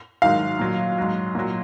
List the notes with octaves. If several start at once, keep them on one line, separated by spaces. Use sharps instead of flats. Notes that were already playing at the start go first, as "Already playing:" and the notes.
G#2 D#3 F#3 F5
A#2 F#3
G#2 F#3
A#2 F#3